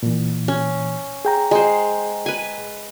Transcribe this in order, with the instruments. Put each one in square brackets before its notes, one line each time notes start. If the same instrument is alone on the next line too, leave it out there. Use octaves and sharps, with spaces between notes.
[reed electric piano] A#2 E3
[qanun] C#4
[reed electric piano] G#4 G5 A#5
[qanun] G#3 C5
B4 G#5